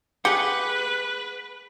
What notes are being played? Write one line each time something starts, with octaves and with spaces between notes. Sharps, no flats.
G4 G#4 B4 F#5